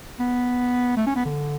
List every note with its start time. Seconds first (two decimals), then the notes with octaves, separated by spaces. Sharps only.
0.20 B3
0.97 A3
1.06 C#4
1.16 B3
1.25 D3